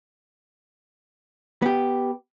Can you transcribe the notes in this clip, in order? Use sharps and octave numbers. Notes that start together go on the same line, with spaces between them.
B3 G4